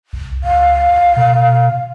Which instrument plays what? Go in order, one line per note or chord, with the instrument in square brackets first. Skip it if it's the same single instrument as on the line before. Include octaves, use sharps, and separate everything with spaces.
[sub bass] C2
[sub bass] C#2 [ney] F5
[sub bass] B2